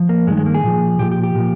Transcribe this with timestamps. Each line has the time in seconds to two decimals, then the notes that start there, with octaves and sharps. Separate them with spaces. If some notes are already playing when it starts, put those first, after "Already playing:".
Already playing: F3
0.09 A#3
0.27 G2 G#3
0.31 D#3
0.37 G#3
0.46 A#3
0.55 G#4
0.64 A#2 F3
0.99 A#2 F3 G4
1.11 G4
1.23 G4
1.35 A#2 F3